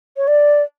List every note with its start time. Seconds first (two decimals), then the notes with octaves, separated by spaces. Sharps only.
0.17 C#5
0.27 D5